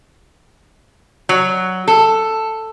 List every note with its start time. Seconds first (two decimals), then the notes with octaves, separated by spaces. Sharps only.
1.29 F#3
1.87 A4